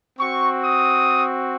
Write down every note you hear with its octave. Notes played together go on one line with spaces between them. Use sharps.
C4 F#4 C#6
D#6